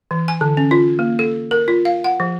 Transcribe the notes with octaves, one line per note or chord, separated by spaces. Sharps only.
E3
G#5
D3
C#4
F4
A#3
A4
A#4
F4
F5
F#5
F3